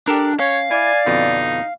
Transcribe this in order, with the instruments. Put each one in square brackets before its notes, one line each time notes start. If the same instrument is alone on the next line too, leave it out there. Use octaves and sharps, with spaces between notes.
[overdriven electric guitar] D4 [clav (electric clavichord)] G4 A4 A#4
[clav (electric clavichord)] C#4 [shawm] C#5 [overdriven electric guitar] F5
[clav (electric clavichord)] E4 [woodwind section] D5 [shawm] G#5
[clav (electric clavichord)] F2 B2 D3 [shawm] D#4